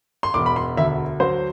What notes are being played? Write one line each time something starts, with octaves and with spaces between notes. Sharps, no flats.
C6
E1 D6
B5
C6
D2 E5
F#3 C5